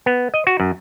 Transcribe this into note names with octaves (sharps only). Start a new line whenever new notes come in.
B3
D#5
F#4
F#2